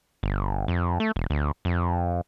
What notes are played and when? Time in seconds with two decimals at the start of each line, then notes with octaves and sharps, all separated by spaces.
0.23 G1
0.68 F2
1.00 A3
1.16 E1
1.30 D2
1.65 F2